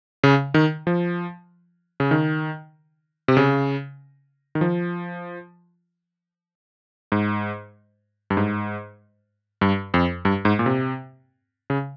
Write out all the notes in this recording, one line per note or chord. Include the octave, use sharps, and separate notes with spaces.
C#3
D#3
F3
C#3
D#3
C3
C#3
D#3
F3
G#2
G2
G#2
G2
F2
G2
G#2
A#2
C3
C#3